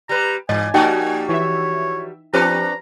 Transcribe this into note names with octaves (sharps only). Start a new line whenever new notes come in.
G3 B4 A#5
G#2 E3 D#5 G#5
F3 G3 A#3 D#4 F#4 D5 D#5 G5
E3 C#5 E5
F3 C4 D4 G4 B4 A#5 F6